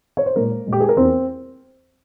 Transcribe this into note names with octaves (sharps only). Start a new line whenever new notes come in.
C#5
C5
A#2 G#3 A#3 A#4
A#2 G#3
G4
G#4
A#4
E2 E3 A#3 C4 C5